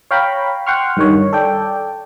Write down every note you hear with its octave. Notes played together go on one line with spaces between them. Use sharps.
C#5 F5 G5 A#5 B5
F#5 G5 C6 C#6 F6
G2 D#3 C#5
A4 D5 G5